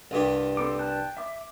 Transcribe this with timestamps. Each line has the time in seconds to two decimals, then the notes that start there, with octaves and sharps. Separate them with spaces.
0.11 C2 G2 G4
0.57 C4 A4 D6
0.79 G5 A5 F#6
1.17 E5 D6